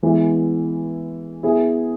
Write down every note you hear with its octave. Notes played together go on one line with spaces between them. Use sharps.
E3 G#3 B3 E4
B3 E4 G#4